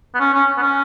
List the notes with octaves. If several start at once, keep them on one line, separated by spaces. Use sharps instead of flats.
B3
C#4
C#4
B3
C#4